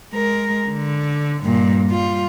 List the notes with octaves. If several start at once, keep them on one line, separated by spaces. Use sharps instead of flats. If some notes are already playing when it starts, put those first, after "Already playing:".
G#3 A#4
D3
G2 A#2
G3 F4